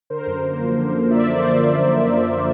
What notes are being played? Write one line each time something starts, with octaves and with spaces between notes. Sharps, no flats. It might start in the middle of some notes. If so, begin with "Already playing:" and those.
D3 A#4 C5
F#2
A#3
F3
D3
F#2
A#3 D5 E5
F3
C5 D5